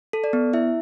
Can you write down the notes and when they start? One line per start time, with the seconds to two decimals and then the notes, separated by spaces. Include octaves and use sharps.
0.13 A4
0.24 D5
0.33 B3
0.53 E4 E5